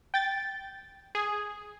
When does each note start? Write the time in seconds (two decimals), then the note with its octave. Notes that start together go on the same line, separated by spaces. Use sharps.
0.14 G5 A6
1.15 G#4